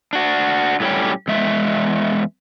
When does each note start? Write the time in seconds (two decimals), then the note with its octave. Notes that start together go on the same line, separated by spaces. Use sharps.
0.13 D4 F#4
0.80 A2 F#3 G3 C#4 G4
1.28 E2 G#3 E5